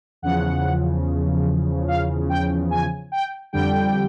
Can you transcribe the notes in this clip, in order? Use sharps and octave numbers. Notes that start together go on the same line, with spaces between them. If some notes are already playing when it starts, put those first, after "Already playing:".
E2 C#3 F3 F#5
F5
G5
G#5
G5
F2 D3 G3 G5